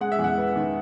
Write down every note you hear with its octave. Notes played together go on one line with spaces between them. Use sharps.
G#3 F#5
E5
E2 F#5
B3
D#3